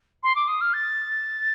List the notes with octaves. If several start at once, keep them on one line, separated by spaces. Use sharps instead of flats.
C6
D6
D#6
F6
A6